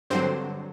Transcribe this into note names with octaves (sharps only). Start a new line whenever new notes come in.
G2 D3 F#3 C4 C5